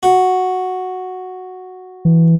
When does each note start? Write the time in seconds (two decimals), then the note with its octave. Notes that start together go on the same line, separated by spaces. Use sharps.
0.03 F#4
2.05 E3